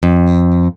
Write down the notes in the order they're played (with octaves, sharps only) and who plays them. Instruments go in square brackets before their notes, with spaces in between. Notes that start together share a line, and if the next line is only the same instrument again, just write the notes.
[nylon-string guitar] F2